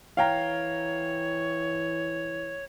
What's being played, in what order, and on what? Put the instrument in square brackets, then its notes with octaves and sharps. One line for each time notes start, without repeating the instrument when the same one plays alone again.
[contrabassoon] E3 [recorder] C#5 [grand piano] F5 G5 A#5